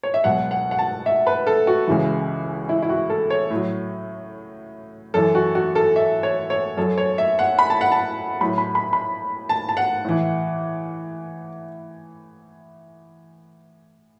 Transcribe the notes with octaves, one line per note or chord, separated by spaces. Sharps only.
C#5
E5
C#2 B2 F#3 F#5
F#5
F#5
A5
E5
B4
A4
F#4
C#2 C#3 E3
E4
E4
F#4
A4
C#5
A2 F#3
F#2 E3 A4
F#4
F#4
A4
E5
C#5
C#5
F#2 F#3 A4
C#5
E5
F#5
B5
A5
F#5
A5
A2 F#3 B5
B5
B5
B5
A5
A5
F#5
A2 E3